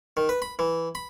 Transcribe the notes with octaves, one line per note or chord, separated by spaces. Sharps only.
D#3
B4
B5
E3
B5